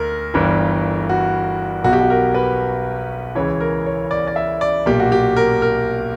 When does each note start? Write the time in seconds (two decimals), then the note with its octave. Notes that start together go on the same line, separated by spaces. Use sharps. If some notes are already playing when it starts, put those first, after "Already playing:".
Already playing: D2 A#4
0.34 G1 G2 E3
1.09 F#4
1.84 B1 B2 F#4
1.93 G4
2.00 F#4
2.10 A#4
2.34 B4
3.35 C#2 C#3 E3 C#5
3.60 A#4
3.86 C#5
4.11 D5
4.27 D5
4.36 E5
4.61 D5
4.86 B1 A#2 G4
5.00 F#4
5.12 G4
5.36 A#4
5.62 A#4